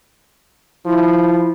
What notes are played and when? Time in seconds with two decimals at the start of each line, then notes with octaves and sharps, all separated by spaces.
0.86 F3 E4